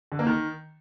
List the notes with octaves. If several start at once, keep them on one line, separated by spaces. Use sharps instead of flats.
D3
A#3
D#3